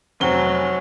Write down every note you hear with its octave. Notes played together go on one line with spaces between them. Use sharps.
F1 F#3 C4 G7